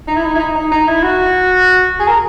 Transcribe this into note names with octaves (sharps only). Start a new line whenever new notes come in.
D#4
E4
D#4
E4
D#4
D#4
D#4
E4
F#4
G#4
A#4